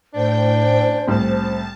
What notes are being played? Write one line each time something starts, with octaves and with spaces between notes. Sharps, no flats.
A2 C#4 D4 C5 G5
C2 A2 A5